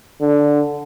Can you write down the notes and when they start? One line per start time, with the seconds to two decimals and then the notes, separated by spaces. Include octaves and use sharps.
0.21 D3